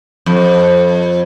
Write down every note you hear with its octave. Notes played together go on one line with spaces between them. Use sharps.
F2